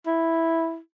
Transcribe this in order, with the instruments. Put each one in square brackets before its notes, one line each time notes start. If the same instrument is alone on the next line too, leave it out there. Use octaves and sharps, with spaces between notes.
[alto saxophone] E4